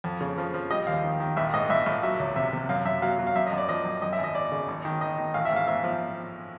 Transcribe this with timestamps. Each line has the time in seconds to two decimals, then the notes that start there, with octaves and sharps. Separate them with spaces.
0.04 F2
0.21 C#3
0.38 F3
0.54 F3
0.71 G3 D#5
0.87 D#2 F5
1.04 D#3
1.20 D#3
1.37 A#1 E5
1.54 G#2 D#5
1.70 A#1 E5
1.86 A#1
2.03 F#3 E5
2.20 C#2
2.36 C3 E5
2.53 C3
2.69 F#2 F5
2.85 F#2 E5
3.02 F#3 F5
3.19 F#3
3.27 F5
3.36 F#2 E5
3.47 D#5
3.52 F#2
3.58 D5
3.69 F3 D#5
3.85 F#2
4.02 F#2 D#5
4.13 E5
4.19 G#1
4.24 D#5
4.35 G#1 D5
4.52 C#3
4.68 G#1
4.85 D#3
5.01 G#1 D#5
5.18 D#3
5.34 A1 F5
5.45 E5
5.51 G#2
5.56 F5
5.67 G#2 E5
5.84 F3